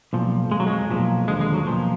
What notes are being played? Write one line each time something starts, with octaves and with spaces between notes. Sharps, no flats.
B1 A#2 F3
F2 F3 G#3
F#3
G#3
B1 A#2 F3
D#2 D3 F3 G#3
G#3
F#3
B1 A#2 F3